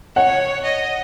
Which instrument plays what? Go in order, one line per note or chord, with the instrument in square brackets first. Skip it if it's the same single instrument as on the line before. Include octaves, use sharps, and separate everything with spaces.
[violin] C#5 [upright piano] F#5
[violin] D#5